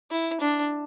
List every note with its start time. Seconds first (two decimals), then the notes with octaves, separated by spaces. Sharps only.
0.11 E4
0.41 D4